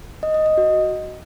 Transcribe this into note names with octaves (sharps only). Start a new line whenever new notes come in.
D#5
D#5
D#5
F#4